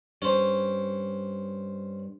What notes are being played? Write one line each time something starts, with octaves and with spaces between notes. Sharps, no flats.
G2 C#4 C5